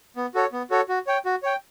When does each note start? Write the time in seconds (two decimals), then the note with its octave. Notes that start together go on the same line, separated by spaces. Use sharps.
0.16 B3
0.35 F#4 A4 C#5
0.52 B3
0.70 F#4 A4 C#5
0.89 F#4
1.07 C#5 G5
1.25 F#4
1.43 C#5 G5